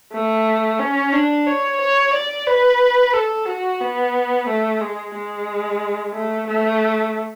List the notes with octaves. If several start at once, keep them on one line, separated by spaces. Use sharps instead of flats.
A3
C#4
D4
C#5
C#5
D5
B4
A4
F#4
B3
A3
G#3
G#3
A3
A3